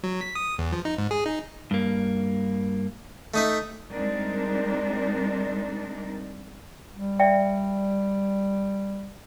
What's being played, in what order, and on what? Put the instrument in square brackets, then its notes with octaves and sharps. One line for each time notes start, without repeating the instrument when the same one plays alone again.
[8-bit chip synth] F#3
B6
D#6
E2
F3
D#4
G#2
G#4
D#4
[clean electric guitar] G2 A#3
[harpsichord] A3 D#4 E5
[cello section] G3 G#3 C4 D4 D#4 A#4
[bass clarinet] G3
[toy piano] D5 E5 G5